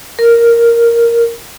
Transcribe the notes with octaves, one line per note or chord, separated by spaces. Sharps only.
A#4